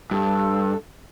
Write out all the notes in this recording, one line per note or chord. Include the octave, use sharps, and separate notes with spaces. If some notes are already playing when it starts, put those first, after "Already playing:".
G2 A4